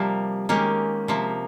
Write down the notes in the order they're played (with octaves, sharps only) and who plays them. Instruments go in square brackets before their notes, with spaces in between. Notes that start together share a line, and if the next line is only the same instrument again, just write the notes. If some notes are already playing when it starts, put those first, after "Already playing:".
Already playing: [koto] C3 F3 A#3 [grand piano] G3
[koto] D#3 A#3 C#4 G4 [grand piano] G#3
[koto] C3 F3 A#3